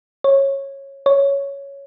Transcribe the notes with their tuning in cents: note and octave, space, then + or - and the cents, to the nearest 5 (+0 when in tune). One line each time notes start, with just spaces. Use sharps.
C#5 -15
C#5 +5